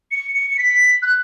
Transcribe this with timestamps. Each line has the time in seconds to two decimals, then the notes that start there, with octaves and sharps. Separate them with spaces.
0.11 C#7
0.35 C#7
0.50 C#7
0.58 B6
1.02 F#6